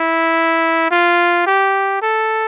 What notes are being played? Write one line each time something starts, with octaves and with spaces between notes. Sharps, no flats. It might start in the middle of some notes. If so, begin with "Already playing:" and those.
Already playing: E4
F4
G4
A4